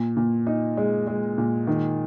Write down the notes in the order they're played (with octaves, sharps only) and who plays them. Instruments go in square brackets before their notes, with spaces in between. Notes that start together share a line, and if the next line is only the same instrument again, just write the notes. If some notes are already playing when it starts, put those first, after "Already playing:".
Already playing: [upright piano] A#2
A#2
D#4
G#3
G#3
A#2
D#3